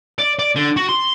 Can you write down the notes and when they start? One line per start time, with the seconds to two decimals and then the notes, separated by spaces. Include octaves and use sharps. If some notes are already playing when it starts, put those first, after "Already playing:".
0.19 D5
0.39 D5
0.56 D3
0.76 F#4
0.89 C6